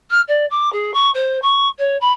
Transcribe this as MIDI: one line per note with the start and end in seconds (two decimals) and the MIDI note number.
0.10 0.21 89
0.27 0.45 74
0.50 0.72 86
0.72 0.93 68
0.93 1.10 85
1.14 1.40 72
1.42 1.68 85
1.78 1.96 73
2.00 2.11 83